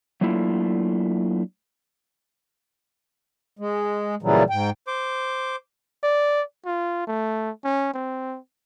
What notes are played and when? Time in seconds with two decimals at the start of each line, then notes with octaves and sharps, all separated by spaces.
0.21 F#3 A3 A#3 D4 E4 F4
3.59 G#3
4.22 A#2 C#3 E3 F#3 G3
4.50 G#2 G5
4.87 C5 D6
6.03 D5
6.65 F4
7.07 A3
7.64 C#4
7.94 C4